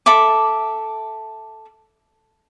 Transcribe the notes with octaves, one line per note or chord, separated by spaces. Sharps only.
A4 E5 B5 D6